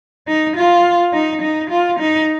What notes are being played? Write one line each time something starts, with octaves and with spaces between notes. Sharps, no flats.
D#4
F4
D#4
D#4
F4
D#4